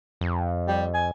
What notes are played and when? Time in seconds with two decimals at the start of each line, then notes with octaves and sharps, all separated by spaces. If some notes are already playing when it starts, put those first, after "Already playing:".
0.21 F2
0.68 G3
0.94 G#5